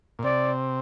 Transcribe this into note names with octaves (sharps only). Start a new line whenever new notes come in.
A#2
C3 D5